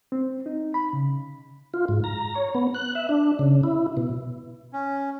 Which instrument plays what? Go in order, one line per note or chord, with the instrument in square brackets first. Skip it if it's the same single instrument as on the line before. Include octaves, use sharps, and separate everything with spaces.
[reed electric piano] C4
D#4
B5
C#3
[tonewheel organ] F4
G#2
A#5
C#5
B3
F#6
E5
D4
C#3
E4
B2
[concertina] C#4